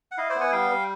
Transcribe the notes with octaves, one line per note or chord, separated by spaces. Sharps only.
F#5
E4 D#5 F5
C5 D5
B3
F#5 G#5
G3 F5 G5
G3